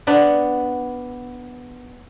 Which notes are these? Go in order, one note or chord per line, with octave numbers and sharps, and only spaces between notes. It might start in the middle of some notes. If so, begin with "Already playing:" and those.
B3 D4 D5 F#5